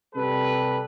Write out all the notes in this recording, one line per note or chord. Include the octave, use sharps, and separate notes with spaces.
C3 G3 A4 B4